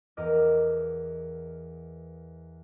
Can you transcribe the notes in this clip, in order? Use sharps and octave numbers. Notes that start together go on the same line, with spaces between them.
E2 A#4 D#5 D6 F6